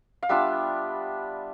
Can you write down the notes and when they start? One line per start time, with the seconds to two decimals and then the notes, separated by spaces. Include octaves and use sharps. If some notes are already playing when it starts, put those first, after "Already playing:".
0.23 F5
0.29 G3 B3 D4 F4 E5